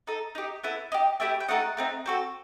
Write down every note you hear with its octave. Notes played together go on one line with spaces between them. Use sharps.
D#4 A4
D#4 G4
B3 E4 A4
D#4 G4
A3 E4 G4 E5 G5
G5
A3 D#4 A4 D#5 F#5
A3 C4 D#4
C4 F#4 A4